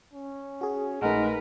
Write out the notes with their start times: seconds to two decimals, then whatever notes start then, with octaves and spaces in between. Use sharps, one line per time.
0.14 C#4
0.61 F#4 G#4
1.02 A#1 G#3 A3 D#4 A#4 B4 F#5